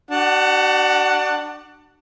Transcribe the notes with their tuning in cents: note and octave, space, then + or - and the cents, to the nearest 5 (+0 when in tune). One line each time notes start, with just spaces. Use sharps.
D4 +20 F#4 +45 F#5 +0